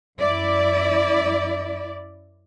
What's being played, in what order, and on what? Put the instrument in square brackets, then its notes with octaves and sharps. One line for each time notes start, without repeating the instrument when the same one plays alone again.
[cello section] F#2 E4 D5